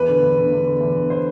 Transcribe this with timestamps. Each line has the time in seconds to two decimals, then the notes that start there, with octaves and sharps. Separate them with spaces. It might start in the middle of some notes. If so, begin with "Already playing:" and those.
Already playing: E2 B4
0.08 D3
0.23 E2
0.38 D3
0.52 E2
0.67 D3
0.81 E2
0.96 D3
1.10 C5